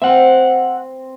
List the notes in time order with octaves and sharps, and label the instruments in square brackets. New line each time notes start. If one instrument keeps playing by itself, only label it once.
[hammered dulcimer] C4 [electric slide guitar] E5 F#5